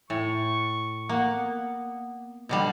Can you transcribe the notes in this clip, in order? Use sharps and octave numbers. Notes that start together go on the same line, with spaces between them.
A2 C#6
A#3 F#5
B3
B2 D3 G3